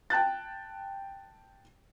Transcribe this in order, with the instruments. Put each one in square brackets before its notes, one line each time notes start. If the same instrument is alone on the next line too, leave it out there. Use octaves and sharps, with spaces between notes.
[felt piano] G5 A5 F#6 A6